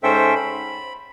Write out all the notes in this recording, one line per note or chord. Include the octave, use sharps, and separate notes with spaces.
G#2 C#4 A4 C5 E5 G5
B5